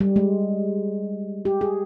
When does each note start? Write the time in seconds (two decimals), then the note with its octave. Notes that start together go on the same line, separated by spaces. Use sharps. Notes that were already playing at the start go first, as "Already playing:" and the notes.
0.01 G3
0.16 G#3
1.45 G4
1.61 G#4